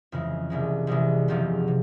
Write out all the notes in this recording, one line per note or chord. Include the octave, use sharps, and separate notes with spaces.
F2 C#3 E3 G#3
C2 C3 E3 G#3
C2 C3 E3 G#3
F#1 E2 C3 F3 G#3
C3